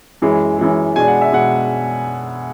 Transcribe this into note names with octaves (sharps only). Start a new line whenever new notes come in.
F#2 E3 G#3
F#2 E3 G#3
B2 G#3 D4 G#5
F#5
E5
B2 G#3 D4 F#5